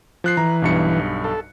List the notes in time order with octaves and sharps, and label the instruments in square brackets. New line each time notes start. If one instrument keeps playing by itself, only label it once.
[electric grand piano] F3 F#6 C7
[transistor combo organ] E3 [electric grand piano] A#5
[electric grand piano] B1 G2 C#7
[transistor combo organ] A4